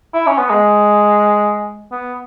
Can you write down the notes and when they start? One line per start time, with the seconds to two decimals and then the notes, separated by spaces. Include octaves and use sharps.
0.14 E4
0.27 C#4
0.38 B3
0.50 G#3
1.92 B3